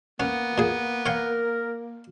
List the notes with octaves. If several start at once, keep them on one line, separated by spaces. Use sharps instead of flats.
A#3 B3 C#4
A#2 G#4
A#4 C#5 F5 G5